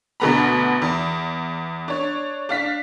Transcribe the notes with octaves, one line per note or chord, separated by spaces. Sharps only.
D2 B2 D3 B3 A#5 B5
E2
D4 C#5
D4 F5 B6